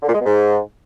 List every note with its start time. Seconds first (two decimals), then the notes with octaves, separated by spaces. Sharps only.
0.02 D3
0.08 A#2
0.14 G#3
0.20 B2
0.26 G#2